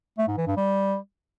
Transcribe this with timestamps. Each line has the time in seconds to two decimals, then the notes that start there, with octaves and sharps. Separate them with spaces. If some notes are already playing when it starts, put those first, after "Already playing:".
0.18 A3
0.28 G#2
0.37 E3
0.47 G2
0.57 G3